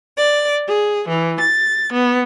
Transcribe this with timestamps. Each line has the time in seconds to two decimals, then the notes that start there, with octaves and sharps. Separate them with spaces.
0.18 D5
0.68 G#4
1.08 E3
1.40 A6
1.92 B3